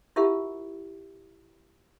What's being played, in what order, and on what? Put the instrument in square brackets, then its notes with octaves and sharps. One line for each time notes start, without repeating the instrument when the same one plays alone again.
[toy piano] E4 F4 G4 A#4 E5 F#5